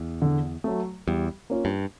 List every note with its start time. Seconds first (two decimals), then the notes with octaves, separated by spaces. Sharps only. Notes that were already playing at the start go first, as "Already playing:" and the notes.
Already playing: E2
0.22 D3
0.64 F#3 A3
1.07 E2 G3
1.50 A#3 C#4 F4
1.65 G2